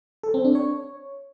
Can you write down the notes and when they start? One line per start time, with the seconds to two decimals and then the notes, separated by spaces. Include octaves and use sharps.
0.23 A4
0.34 C4
0.44 D4
0.55 C#5